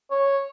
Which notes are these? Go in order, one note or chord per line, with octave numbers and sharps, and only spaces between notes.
C#5